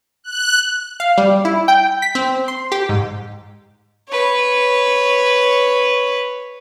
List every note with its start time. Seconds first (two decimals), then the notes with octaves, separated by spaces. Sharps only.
0.24 F#6
1.00 F5
1.18 G3
1.45 E4
1.68 G5
2.02 B6
2.15 C4
2.48 C6
2.72 G4
2.89 G#2
4.09 B4 C#5